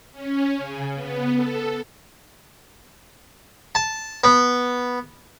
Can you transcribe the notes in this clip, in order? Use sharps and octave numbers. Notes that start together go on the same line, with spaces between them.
C#4
C#3
B3
A4
A5
B3